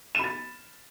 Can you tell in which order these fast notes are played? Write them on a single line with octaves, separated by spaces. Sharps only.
E7 B5 A6